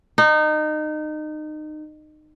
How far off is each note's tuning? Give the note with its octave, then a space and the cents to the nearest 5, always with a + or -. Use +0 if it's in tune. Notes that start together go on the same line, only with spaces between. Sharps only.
D#4 -25